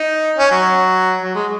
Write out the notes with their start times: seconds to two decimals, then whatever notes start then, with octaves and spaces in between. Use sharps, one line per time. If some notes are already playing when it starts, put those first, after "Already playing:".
Already playing: D#4
0.37 C#4
0.51 F#3
1.23 F#3
1.35 G#3